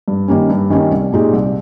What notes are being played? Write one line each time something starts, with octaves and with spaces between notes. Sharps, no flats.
G2
D#3 G3 A#3 C#4
G2
D#3 G3 A#3 C#4
C2
A#2 G#3 D#4 G4
C2